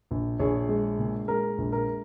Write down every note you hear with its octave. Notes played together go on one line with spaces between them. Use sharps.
A#1
A#1 G#4 C#5
G#3
A#2
G#3 A#4
A#1
A#4